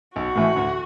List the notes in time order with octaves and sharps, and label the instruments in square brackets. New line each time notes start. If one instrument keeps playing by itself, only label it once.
[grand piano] B1 [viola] F#4
[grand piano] A2 E3 A3
D2